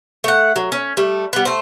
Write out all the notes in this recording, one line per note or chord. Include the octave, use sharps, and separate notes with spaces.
A3 F#5
F#3
C#4
G3 A3
G3 B3
A3 C5